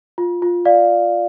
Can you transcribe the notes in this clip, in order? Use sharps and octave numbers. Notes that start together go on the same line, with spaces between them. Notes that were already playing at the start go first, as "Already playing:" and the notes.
F4
F4
D5 F5